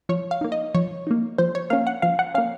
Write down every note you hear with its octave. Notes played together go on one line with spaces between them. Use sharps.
F3 C#5
F5
A#3 D#4
D#5
F3 C#5
A#3 D#4
F3 C5
C#5
A#3 C#4 F5
F#5
F3 F5
F#5
A#3 C#4 F5